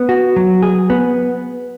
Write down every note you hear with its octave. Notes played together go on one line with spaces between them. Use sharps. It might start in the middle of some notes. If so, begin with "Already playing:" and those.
Already playing: B3
F#4
F#3
G#4
B3